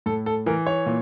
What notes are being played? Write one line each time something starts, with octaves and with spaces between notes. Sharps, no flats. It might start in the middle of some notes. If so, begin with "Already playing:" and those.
A2 A4
A4
E3 A#4
C#5
A#2